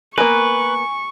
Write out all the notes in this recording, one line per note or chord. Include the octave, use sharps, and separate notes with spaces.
A#3 B3 A#4 B4 G#5 C#6